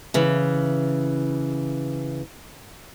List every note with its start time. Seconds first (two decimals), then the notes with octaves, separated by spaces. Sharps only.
0.14 C#3 E3